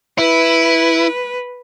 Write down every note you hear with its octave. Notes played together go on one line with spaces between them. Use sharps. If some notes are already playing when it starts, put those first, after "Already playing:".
E4 B4